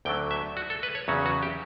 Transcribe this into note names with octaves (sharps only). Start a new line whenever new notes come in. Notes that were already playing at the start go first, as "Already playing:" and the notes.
D2 D3 F#3 A3 G5
E5
F#4
A4
B4
C#5
E2 C#3 F#3 C#4 F#4
F#4
G4